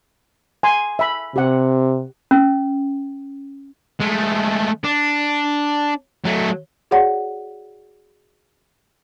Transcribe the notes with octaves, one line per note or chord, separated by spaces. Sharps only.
G#5 C6
E5 B5
C3 G4 F#5
C#4
G#3 A3
D4
F#3 A3
F#4 G#4 C#5 D5 F#5